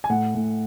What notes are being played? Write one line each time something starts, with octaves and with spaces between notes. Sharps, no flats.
G#5
A2 F#5
A2